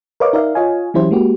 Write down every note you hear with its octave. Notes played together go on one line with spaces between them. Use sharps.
A#4 B4 C#5 D#5 F5 D6
D#4 A#4 D5 E5 F5
F4 C#5 D#5 F5 G#5
E3 F#3 C#4 E4 G4 C5
G#3 A#3 F#4 G4